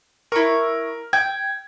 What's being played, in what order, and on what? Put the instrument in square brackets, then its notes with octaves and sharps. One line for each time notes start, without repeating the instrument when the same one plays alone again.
[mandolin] E4 C#6 [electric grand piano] A#4
[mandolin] G5 [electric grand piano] G#6